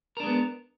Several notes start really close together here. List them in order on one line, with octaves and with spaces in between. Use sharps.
A#4 D4 G#3 B3